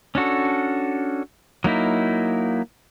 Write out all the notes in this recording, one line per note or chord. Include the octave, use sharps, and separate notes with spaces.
C#4 D4 F#4 A4
F#3 A#3 D#4 E4